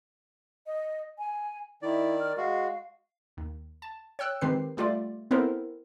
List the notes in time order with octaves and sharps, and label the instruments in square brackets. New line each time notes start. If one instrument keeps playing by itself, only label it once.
[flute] D#5
G#5
[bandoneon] D#3 D5 [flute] E4
[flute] F6
[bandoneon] G#3 F#4 [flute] F5
[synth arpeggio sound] D#2
A5
C#5 G5 E6 F#6
D#3 G#3 C4 G4 B4 C7
G3 A3 F4 G4 D5
B3 C4 E4 A4 A#4 C5